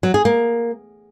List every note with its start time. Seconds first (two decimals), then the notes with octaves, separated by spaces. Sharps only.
0.03 F#3
0.14 G#4
0.25 A#3